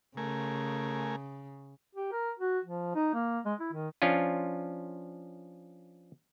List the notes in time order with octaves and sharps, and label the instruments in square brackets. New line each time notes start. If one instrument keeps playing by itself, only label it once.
[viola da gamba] C#3 [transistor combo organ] A3 A#4 G#5
[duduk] G4
A#4
F#4
F3
D#4
A#3
G#3
E4
D#3
[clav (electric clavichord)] F3 C#4 D4 F4